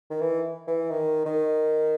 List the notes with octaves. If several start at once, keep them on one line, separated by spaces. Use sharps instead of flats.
D#3
E3
E3
D#3
D#3